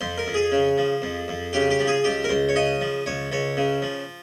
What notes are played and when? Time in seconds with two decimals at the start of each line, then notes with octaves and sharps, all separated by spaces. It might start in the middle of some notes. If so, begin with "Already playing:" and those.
0.01 F2 C5
0.18 A#4
0.27 F2
0.34 G#4
0.52 C#3
0.78 F3
1.02 F2
1.28 F2
1.53 C#3 G4
1.70 G4
1.79 F3
1.87 G#4
2.04 C#2 G4
2.24 A#4
2.29 C#2 C5
2.49 C#5
2.56 C#3 D#5
2.81 F3
3.06 C#2 C#5
3.32 C#2 C#5
3.57 C#3
3.82 F3